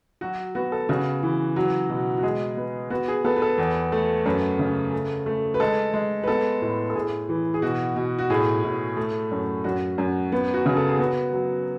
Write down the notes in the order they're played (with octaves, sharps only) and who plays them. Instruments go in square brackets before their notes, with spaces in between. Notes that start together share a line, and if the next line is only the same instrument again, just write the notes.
[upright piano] F#3 F#4
B3 F#4
A4
C#3 F#4
E3
F#3
B2
F#4
G#3 G#4
B3
B3 F#4
G#4
B3 A4
B4
A4
E2
A3
F#2 B4
C#3
A3
A3
B4
G#3 A4
G#3
B4
B3 A4
A2
A4
A2 G#4
E3
G#4
B2 F#4
B2
F#4
A2 G#4
A2
A3
F#2
F#2 F#4
F#2
B3
F#4
C#3
A4
G#4
B3 F#4
F#3